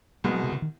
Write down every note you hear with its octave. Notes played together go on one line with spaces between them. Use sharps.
C2 B2 G3 G#3
F#3
C3
C#3
D#3